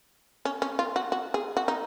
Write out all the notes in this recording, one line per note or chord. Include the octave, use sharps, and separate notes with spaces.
C#4
C#4
F4
F#4
F#4
G#4
F#4
D#4